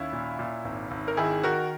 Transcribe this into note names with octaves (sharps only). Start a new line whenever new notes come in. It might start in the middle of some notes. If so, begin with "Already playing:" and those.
Already playing: D#2 C#4 E4
A#2
A#2
G#1
G#1
A#4
D#3 E4 G#4
D#3 F#4 A#4